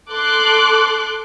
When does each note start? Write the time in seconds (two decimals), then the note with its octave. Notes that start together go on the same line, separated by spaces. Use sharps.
0.13 A4 C6 D6 F#6